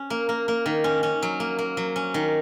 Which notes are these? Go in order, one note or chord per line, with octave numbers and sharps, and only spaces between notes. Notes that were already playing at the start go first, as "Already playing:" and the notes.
Already playing: C#4
A#3
A#3
A#3
D#3
C#4
C#4
F#3
A#3
A#3
F#3
C#4
D#3